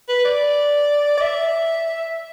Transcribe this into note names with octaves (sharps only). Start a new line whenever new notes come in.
B4
D5
D5
E5